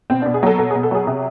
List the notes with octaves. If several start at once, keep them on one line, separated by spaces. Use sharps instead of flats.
B2 C4
B2 D4
G#4
F#3 A4
B2 A4
B2 G#4
A4
F#3 G#4
C3 G#4